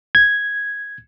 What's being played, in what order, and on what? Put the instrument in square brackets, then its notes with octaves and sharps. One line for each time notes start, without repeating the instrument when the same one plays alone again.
[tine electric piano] G#6